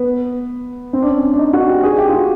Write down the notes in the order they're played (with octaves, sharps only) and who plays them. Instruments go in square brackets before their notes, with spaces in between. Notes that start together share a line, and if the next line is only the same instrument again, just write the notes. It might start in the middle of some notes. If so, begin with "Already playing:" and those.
Already playing: [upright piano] B3
C4
D4
C#4
D4
D4
D#4
F#4
G4
G#4
G4
F4
F#4